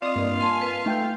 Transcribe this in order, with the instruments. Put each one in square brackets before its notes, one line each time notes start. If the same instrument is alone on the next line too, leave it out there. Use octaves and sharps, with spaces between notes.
[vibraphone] C4 D#5 [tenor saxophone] F4 [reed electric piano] D5 [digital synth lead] D#6
[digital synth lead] G2 [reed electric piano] A#3 A#4
[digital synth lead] G#5 [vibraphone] A5 C6
[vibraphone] B4
[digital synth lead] A3 [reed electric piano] D#4 G5 G6